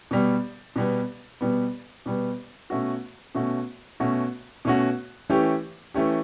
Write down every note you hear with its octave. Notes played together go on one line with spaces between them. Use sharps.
B2 G3 B3
B2 G3 B3
B2 G3 B3
B2 G3 B3
B2 A3 C#4 F#4
B2 A3 C#4 F#4
B2 A3 C#4 F#4
B2 A3 C#4 F#4
E3 A3 C#4 G4
E3 A3 C#4 G4